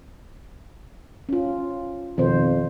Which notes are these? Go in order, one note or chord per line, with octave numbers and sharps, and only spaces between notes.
C#4 F4
F2 B2 D#3 C5